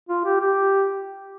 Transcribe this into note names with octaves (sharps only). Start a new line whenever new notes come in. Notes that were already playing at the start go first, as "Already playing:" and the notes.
F4
G4
G4